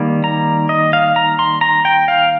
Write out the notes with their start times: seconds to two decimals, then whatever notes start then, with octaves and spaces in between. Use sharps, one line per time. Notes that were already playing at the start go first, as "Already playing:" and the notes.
Already playing: D#3 G3 A#3
0.24 A#5
0.69 D#5
0.93 F5
1.16 A#5
1.39 C6
1.61 A#5
1.85 G5
2.08 F5